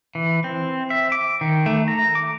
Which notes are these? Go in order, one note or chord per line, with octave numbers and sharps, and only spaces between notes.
E3
C4
E5
D6
D#3
A3
A#5
D6